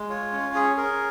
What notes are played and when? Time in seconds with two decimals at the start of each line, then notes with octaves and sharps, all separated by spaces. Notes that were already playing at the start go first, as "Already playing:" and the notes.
Already playing: G#3
0.09 F4 C#5
0.32 C#4
0.55 G#4
0.76 G#4 A#4